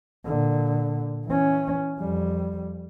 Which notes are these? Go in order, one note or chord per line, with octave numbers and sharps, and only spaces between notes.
A#2 D3
E3 C#4
F2 G3